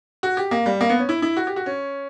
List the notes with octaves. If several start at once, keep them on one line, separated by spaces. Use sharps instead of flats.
F#4
G4
A#3
G3
A#3
B3
C#4
E4
E4
F#4
G4
F#4
C#4